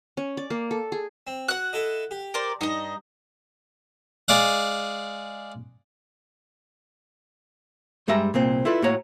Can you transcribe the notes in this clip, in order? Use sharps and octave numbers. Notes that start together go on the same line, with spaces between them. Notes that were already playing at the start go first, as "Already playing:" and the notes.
C#4
D5
A#3
A4
G#4
C4
F#4 F#5 F#6
E4 A4 D#5
G4
A#4 C5 D5
G2 D#4 D#5
G#3 D5 F5 F#5
G2 G3 G#3 E5 A#5
C2 A#2 C4
E4 F4 A4 B4 D5
A2 A#3 F#4 C#5 A#5